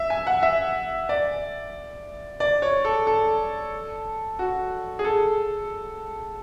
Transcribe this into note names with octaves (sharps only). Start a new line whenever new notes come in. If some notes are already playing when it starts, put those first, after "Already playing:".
Already playing: E5
G#5
F#5
E5
D5
D5
C#5
A4
A4
F#4
G#4
A4